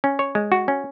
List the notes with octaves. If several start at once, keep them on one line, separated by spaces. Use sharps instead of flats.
C#4
C#5
G#3
F#4
C#4